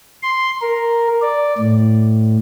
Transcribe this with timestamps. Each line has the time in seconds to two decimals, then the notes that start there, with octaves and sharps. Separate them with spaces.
0.23 C6
0.61 A#4
1.22 D5
1.58 A2